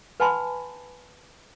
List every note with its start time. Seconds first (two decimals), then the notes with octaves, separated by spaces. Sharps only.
0.20 B4 F#5 G#5 A5 B5 C6